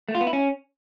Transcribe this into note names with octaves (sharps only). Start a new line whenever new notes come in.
A3
F4
B3
E4
C#4